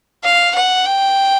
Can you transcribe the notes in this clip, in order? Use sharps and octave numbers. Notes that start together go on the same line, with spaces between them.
F5
F#5
G5